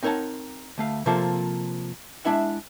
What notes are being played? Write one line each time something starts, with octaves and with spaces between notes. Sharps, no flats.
C4 D#4 A#4 C#5 F#5 A5
D2 A3 F5
C3 F3 A#3 F4 A4 C5
G#3 D4 E4 E5 F#5